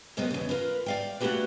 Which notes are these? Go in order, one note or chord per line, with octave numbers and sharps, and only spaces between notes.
F#2 C3 A#3 B3 G4 D#5
E2 C#3
F4 A#4 B4
D5 F5 G5
A3 A#3 D#4 F#4 G4 B4